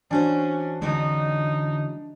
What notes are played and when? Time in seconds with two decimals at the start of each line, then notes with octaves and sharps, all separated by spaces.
0.11 E3 C#4 D4 F#4 C5
0.82 D3 E3 G#3 C#4 D#4 F#4